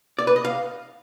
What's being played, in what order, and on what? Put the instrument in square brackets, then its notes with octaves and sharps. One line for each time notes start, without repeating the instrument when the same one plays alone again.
[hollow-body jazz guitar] D5
B4
D#5
F5